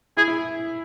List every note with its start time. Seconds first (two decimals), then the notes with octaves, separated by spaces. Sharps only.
0.17 E4 G#4
0.28 E4